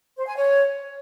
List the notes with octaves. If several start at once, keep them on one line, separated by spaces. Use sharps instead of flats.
C5
G#5
C#5